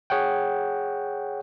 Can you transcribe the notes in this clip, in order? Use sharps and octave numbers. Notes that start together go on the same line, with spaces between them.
G#4 C#5 F#5 G5